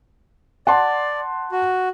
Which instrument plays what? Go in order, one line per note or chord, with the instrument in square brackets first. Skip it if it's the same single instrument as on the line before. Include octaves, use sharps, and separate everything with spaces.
[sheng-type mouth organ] D5 [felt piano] F#5 A5 C6
[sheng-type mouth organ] F#4